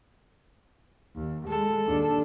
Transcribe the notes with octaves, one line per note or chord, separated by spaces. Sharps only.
D#2
G#3 A4
D#2 D4